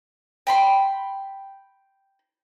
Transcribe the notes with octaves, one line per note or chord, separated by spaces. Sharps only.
G5 B5 C6